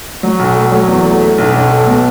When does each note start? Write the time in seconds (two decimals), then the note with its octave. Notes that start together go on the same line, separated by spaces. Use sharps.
0.23 F#3
0.39 B1
0.55 A3
0.72 F#3
0.88 E2
1.05 A3
1.21 A3
1.38 B1
1.53 B1
1.71 A4
1.87 B2